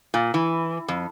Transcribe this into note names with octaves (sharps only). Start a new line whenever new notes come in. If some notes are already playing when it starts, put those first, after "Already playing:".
A#2
E3
F2